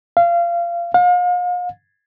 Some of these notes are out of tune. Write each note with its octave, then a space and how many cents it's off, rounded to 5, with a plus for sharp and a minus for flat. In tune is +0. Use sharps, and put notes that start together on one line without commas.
F5 -25
F5 +40